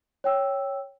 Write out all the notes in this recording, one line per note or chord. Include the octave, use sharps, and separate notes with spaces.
C#5 G5 E6